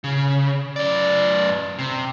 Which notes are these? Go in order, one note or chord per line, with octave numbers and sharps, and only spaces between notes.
C#3
F#2 D5
C3